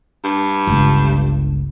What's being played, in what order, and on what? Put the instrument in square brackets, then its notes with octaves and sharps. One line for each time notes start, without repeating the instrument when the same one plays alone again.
[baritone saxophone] G2
[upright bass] G1 C#2